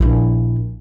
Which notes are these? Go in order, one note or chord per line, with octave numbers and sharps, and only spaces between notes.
A#1 E4